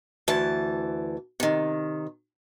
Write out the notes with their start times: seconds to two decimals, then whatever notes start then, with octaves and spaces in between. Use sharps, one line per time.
0.28 D2 E3 A5
1.40 C3 D#3